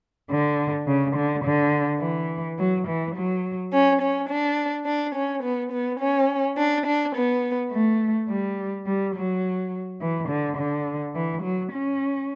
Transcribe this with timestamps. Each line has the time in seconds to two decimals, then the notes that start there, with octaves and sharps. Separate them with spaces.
0.30 D3
0.87 C#3
1.15 D3
1.44 D3
2.02 E3
2.58 F#3
2.87 E3
3.15 F#3
3.73 C#4
4.01 C#4
4.30 D4
4.86 D4
5.15 C#4
5.43 B3
5.72 B3
6.00 C#4
6.57 D4
6.86 D4
7.15 B3
7.72 A3
8.29 G3
8.86 G3
9.15 F#3
10.00 E3
10.29 D3
10.57 D3
11.14 E3
11.42 F#3
11.71 C#4